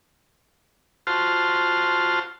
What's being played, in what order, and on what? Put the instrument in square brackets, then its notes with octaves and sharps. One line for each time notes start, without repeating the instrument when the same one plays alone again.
[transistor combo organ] F4 F#4 C5 A5 C6 F6